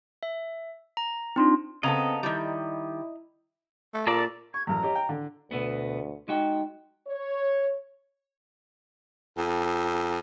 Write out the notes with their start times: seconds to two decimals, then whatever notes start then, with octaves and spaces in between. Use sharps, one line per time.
0.23 E5
0.97 A#5
1.36 C4 D4 D#4 F4 C6
1.83 C#3 B3 C4 A4 D#5 A#5
2.23 D#3 G3 E4
3.94 A3
4.07 A#2 A4 A#4 D5
4.54 C#6 G#6
4.67 A1 F#2 A#5
4.82 G4 C#5 D#5
4.95 G5
5.09 D3
5.51 D2 B2 A3 B3
6.28 G#3 D#4 F#4 G5
7.07 C#5
9.37 F2